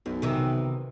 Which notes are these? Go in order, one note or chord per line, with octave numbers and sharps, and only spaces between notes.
B1 F#2
C3 D#3 E3